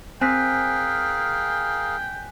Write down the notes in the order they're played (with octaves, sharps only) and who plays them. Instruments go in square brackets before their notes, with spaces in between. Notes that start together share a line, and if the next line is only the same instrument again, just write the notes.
[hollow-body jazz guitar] C4 [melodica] G#4 A#4 F5 [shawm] G5 [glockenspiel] G#5 F#6 B6